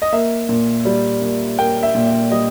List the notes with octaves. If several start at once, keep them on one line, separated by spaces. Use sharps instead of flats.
D#5
A#3 E5
A#2
G3
A#2
A#3 G5
E5
A#2
E5
G3 D#5